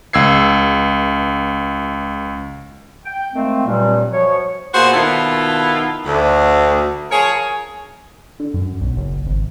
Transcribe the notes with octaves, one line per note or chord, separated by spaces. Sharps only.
C#2 E6 G#6 C7
G5
D#3 F3 G#3 A3 C4
G2 A#2 F#3 G3
F#2 F3 C#5
A#2 A#3 B3 F#4 G#4 C5
B2 D#3 B3 E4 F4 A4
D2
F3 G#4 A#4 C#5
D3
F#2
B1
F#1
G#1